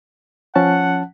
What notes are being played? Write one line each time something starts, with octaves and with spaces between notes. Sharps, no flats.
F3 C#4 F#5 A5